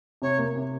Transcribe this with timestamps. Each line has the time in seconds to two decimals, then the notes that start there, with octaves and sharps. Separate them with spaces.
0.22 C3 C#5
0.39 A#3
0.56 C3